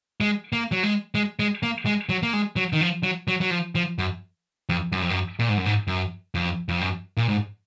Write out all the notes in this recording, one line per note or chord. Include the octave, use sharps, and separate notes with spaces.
G#3
A#3
F#3
G#3
G#3
G#3
A#3
G#3
F#3
A#3
G#3
F#3
D#3
F3
F#3
F#3
F#3
F3
F3
F#2
F2
F#2
F2
F#2
A#2
G#2
F#2
G#2
F#2
F2
F2
F#2
A#2
G#2